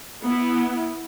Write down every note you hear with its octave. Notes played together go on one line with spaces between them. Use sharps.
B3 E4